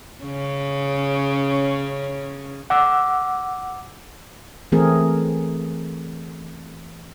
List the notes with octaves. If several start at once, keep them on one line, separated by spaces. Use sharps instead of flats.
C#3 C#4
F#5 D6 E6
E3 A3 C4 G#4 A#4